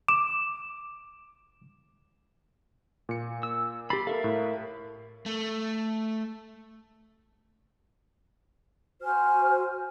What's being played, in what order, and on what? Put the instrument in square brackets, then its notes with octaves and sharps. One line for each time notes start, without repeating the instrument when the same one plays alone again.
[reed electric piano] D6 [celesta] E7
[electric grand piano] A#2 C#7
[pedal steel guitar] E6
[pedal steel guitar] G4 B5 [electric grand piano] A6 C7
[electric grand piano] A4 [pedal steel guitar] A#4 E5 F5
[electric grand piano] A2
[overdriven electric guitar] A3
[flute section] F#4 C5 G#5 F6